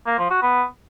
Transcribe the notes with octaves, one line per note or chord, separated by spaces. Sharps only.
A#3
F3
F#4
B3